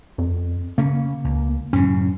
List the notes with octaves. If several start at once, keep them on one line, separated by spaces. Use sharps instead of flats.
F2
C#3 A#3 C#4
C#2
F#2 A2 C#3 C#4